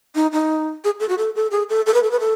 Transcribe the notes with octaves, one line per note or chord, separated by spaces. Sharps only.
D#4
D#4
G#4
A4
F#4
A4
A4
G#4
A4
A4
B4
A4
B4
A4